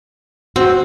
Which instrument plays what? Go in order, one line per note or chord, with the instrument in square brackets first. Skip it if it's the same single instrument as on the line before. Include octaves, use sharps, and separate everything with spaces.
[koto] C4 [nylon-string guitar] F#4